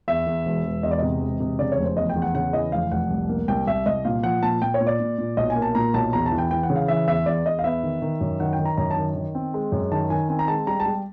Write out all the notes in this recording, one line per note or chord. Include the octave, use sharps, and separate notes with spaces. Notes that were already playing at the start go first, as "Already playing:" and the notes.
E2 E5
E2
E1
E1
E2 D#5
D5
C3 D#5
E1
C3
C#3 D5
C#5
F1
C5
E2 D#5
G5
E2
F#5
C#3 F#5
E3 D#5
F1 F5
F1 F#5
C2
A#3
C2 G5
C2 E5
C2 D#5
A#2 F5
F3 F#5
A#2 A5
A#2 G5
C#5
A#2
D5
A#2
A#2
B1 D#5
G#5
A#3
A5
A#2 A#5
B1 A5
E2 A#5
A5
E3
G5
E3 G5
F#5
C#3
F5
E3 E5
E2 E5
E2 D5
E2 D#5
F5
B3 E5
D#3
D#3
F#2
D#3 F#5
G5
D#3
A#5
F#2 A#5
A5
D#3
D#3
C4
G#3
F#2
D#3 A5
D#3 G#5
C4 G#5
A#5
G#3 A5
G3 A#5
A5
G3